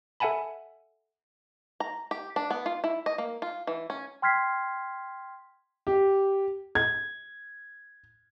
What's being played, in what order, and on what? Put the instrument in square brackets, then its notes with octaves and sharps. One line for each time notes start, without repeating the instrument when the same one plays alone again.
[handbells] A4 E5 F#5 G#5 A5 B5
[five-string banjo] A#5
G4
D4
B3
F4
E4
D#5
A#3
F4
E3
C#4
[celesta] G5 C6 F6 G#6 B6 C7
[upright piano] G4
G#6